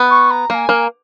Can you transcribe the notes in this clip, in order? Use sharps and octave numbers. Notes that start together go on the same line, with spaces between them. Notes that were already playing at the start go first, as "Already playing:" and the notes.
Already playing: B3
C#6
A#5
A#3 G#5 A#5
A#3